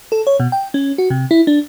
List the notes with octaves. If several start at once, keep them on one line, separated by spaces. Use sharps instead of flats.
A4
C#5
B2
G5
C#4
F#4
C3
E4
D4